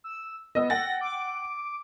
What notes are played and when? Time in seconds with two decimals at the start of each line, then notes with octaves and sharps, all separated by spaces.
0.04 E6
0.55 B3 D#5 E6
0.70 F#5 G5 A6 A#6
1.01 D6